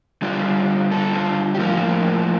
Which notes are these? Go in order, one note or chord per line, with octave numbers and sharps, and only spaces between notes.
D3 G3 D4 F4
A4
F4
G4
A2 F3 A#3 F4